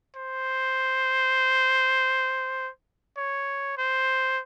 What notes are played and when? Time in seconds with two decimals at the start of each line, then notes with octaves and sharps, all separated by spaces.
0.16 C5
3.17 C#5
3.78 C5